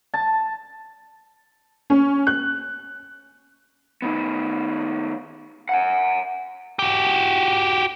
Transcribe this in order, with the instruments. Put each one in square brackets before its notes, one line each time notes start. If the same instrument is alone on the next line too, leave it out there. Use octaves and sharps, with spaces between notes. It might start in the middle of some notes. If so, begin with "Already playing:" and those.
[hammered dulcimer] A5
[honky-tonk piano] C#4
F#6
[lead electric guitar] D#3 B3
F#5 G#5
F#4 G4